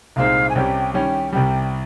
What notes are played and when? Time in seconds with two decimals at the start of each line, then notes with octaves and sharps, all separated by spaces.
0.16 C2 A#2 G#3 C4 D#4 F5
0.49 G#5
0.55 C2 C3 G3 C#4 G4 G5
0.94 D#3 G3 C#4 G5
1.33 C2 C3 G3 G5